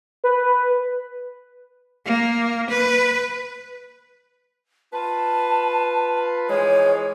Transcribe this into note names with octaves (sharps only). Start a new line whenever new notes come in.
B4
A#3
B4
F4 B4 A5
E3 F3 G#3 C#5